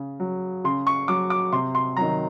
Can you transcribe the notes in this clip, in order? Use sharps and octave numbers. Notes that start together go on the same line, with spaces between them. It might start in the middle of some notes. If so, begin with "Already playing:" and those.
Already playing: C#3
F#3
C#3 C6
C#6
F#3 D6
D6
C3 C6
C6
D#3 F#3 A#5